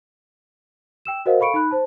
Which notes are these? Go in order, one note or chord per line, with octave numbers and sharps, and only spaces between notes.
G5 E6 E7
F#4 A#4 C5 D#5 F5 F#5
A4 F5 B5 C#6 C#7 D7
D#4 B5 F#6
C5 A5